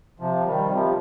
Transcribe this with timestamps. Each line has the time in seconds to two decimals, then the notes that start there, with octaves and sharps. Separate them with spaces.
0.20 C3 F3
0.46 D#3 G3
0.72 C3 F3